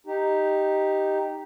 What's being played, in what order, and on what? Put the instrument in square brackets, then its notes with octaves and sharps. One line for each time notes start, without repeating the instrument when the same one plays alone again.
[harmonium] D#4 G4